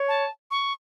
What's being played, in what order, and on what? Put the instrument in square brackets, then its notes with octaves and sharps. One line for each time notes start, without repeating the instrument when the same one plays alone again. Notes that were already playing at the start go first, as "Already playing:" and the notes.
Already playing: [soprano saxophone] C#5
[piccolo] A5
C#6